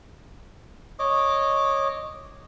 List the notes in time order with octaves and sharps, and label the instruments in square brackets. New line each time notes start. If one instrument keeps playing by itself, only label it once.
[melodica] C#5 D#5 D6